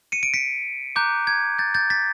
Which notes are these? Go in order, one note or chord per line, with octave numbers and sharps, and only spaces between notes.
C#7 D#7
D7
B6 C#7
A#5 D6 F#6 G6
G#6
G6 A6
G6 A6
A6 B6